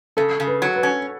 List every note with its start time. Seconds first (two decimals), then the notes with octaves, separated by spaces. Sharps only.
0.17 C#3 A4
0.40 C#3
0.47 B4
0.62 F#3
0.76 B4
0.83 C#4